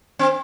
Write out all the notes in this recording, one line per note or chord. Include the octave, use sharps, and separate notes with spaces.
C4